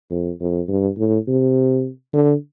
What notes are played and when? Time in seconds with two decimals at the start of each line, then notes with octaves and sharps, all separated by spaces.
0.10 F2
0.40 F2
0.68 G2
0.98 A2
1.27 C3
2.13 D3